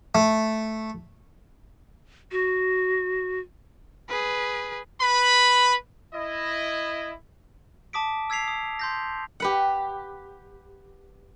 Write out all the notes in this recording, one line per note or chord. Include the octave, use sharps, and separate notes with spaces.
A3
F#4
G#4 B4
B4 B5
E4 D#5
A5 D6 D#6 B6 D7
E6 G#6 B6 C7 F7
D#6
C6 G6 A#6
G4 B4 F#5